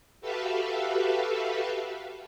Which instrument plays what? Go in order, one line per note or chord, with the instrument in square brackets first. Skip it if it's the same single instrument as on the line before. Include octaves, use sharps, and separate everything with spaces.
[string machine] F#4 G4 A4 B4 E5 F5